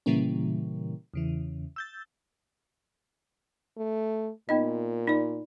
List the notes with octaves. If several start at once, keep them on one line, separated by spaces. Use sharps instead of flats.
A#2 C#3 E3 G3 A#3 C#4
E2 C#3 E3
E6 G6 A6
A3
A#2 B3 D#4 D#5
D#4 D5